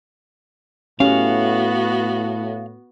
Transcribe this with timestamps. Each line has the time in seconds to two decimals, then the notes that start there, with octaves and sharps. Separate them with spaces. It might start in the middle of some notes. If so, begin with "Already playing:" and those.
1.00 A2 B3 C#4 F#4 G4 F5